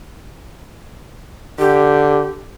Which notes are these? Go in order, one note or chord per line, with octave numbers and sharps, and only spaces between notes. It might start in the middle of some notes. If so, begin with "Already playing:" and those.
D3 G4